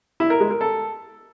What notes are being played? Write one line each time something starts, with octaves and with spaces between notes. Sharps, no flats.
E4
A#4
G#3
A#4
A4